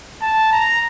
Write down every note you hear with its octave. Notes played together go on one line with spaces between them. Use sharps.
A5
A#5